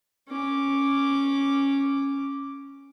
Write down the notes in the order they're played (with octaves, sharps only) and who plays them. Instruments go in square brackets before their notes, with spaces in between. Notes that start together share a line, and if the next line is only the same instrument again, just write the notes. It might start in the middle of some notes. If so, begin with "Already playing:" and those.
[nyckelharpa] C#4 D6